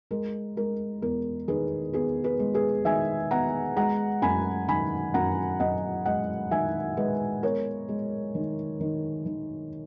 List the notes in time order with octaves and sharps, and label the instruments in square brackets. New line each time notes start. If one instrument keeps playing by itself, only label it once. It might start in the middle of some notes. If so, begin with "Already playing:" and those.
[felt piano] G#3 A#4
G#3 A#4
E2 A#4
D#3 G#4 B4
B3 G#4 B4
G#4 B4
G#3
G#4 B4
D#3 E5 G#5
B3 F#5 A#5
G#3 F#5 A#5
F#2 G#5 B5
D#3 G#5 B5
F#2 F#5 A#5
F#2 D#5 F#5
G#3 D#5 F#5
D#3 E5 G#5
G#3 B4 D#5
B3 A#4 C#5
G#3
D#3
D#3
D#3